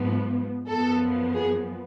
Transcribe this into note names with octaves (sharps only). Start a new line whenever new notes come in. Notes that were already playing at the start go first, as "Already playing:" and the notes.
Already playing: G#2 F3 B3
F#2 F3 B3 A4
G#4